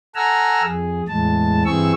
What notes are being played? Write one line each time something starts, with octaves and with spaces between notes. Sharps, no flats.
A4 F#5 G#5 A#5 E6 F6
F2 G#4
E2 A2 G#3 A5
G2 E3 C4 G#4 C#6 E6